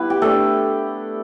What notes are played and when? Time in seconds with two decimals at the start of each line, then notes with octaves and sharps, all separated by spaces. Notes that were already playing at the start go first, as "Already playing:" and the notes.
Already playing: G3 B3 E4 B4
0.10 G4
0.22 A3 D4 A4